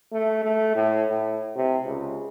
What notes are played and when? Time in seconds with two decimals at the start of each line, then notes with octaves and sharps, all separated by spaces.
0.12 A3
0.44 A3
0.76 A2
1.10 A2
1.56 C3
1.85 C#2